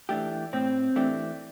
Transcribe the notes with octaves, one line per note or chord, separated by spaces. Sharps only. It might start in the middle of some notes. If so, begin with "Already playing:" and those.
E3 A3 D4 G4
A2 C4
E3 A3 D4 G4